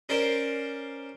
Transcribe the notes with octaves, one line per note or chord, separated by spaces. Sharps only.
C#4 A#4 C5 D5